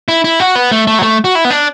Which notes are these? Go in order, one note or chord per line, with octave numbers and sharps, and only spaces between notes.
E4
E4
F#4
B3
A3
A3
F#3
A3
F#4
E4
B3
D4